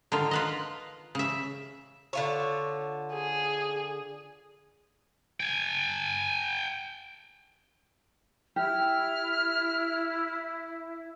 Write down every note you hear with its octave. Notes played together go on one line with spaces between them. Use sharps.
D3 D#3 F4
F4 B4 D#5
C#3 E5
D3 F4 C#5
G#4
G5 G#5
E4 G4 F6